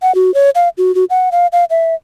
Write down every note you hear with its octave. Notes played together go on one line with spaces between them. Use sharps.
F#5
F#4
C#5
F5
F#4
F#4
F#5
F5
F5
E5